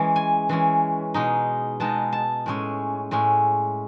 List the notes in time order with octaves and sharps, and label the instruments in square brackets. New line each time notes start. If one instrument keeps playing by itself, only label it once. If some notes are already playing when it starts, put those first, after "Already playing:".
Already playing: [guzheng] E3 G#3 C#4
G#5
E3 G#3 C#4
B2 G#3 D#4
B2 G#3 D#4 A5
A5
A2 G#3 C#4
A2 G#3 C#4